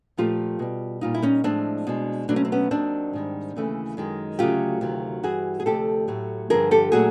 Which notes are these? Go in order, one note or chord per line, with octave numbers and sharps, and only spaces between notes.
A#2 F3 A3 F4 G4
B2 G3
A#2 G3 D#4 F4
E4
C#4 D#4
A2 F3 G#3 C4 D4
B2 G#3
B2 F#3 A3 D4
C#4
C4
B3 C#4
D#2 D#3 F#3 C4 D4
G#2 D#3 G3
D#2 C#3 E3 A3
F#2 D#3 G#3
D2 C#3 F#3 A3 F4 G4
D2 C3 D#3 F#3
G2 E3 G3 F#4 G#4
G#4
D2 C3 F3 A3 G4 A4
A2 F#3 A3
G2 D3 F3 G#4 A#4
G4 A4
A#2 F#3 A3 F#4 G#4